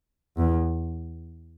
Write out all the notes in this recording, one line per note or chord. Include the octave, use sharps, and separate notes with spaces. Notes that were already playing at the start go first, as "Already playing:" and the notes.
E2